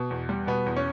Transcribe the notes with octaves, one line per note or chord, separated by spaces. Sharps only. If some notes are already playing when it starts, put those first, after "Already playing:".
Already playing: B2
E2
G3
B2 B3
E2
C#4